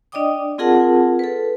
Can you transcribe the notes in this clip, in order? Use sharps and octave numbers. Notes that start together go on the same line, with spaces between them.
D4 D5 D#5 G5 D6 D#6
C4 F4 G#4 A#4 F#5 A5
A4 B4